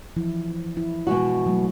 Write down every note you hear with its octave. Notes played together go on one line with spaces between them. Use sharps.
E3 F3 E4
E4
B2 G#3 F#4
F#3 G3 A3